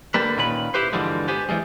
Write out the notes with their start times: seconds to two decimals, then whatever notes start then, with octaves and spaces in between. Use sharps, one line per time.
0.14 D3 G3 A#3 B4
0.37 A#2 D#3 C#4 B4 B5
0.74 E4 G4 B4 C5
0.93 G2 D3 E3 F3 G3 G#3
1.28 B3 G4 C5 G#5
1.49 E3 F3 G3 G#3